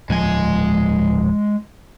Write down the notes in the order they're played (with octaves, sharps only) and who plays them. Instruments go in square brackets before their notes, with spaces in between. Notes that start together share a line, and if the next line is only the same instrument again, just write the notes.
[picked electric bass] D1 F3 [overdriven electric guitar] G#3 G#5